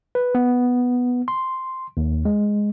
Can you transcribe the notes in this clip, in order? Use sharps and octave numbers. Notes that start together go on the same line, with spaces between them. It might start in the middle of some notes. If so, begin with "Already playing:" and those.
B4
B3
C6
D#2
G#3